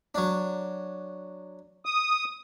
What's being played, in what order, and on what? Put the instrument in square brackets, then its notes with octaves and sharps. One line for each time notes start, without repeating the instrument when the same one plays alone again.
[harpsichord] F#3 D4
[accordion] D#6